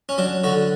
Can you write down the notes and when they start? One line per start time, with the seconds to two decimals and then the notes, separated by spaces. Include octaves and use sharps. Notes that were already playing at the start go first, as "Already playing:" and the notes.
0.09 C#4
0.18 F#3 D4
0.44 D3 F#4